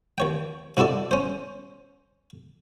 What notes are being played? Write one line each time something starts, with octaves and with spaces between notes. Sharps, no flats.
D#2 C#5 G5
C3 E4 F#4 A4 D5
C#4 C5